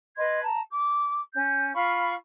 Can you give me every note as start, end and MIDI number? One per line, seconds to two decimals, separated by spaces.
0.16 0.41 71
0.16 0.41 75
0.16 0.41 84
0.16 0.41 92
0.42 0.60 81
0.42 0.60 82
0.70 1.17 86
1.33 1.73 61
1.33 1.73 91
1.74 2.13 65
1.74 2.13 77
1.74 2.13 83
1.74 2.13 85